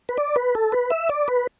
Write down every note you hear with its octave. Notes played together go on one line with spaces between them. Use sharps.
B4
D5
B4
A4
B4
E5
D5
B4